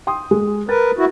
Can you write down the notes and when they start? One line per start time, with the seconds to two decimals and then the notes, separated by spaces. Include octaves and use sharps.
0.07 G5 C6 D#6
0.31 G#3
0.69 A#4 B4 A6
0.98 E4 F#4